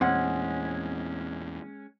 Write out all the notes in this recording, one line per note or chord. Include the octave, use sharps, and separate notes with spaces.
E2 A#2 G#3 C4 C#4 F#5